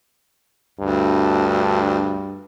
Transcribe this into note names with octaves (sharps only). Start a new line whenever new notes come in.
D2 G2